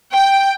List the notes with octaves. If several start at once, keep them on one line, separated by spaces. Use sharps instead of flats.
G5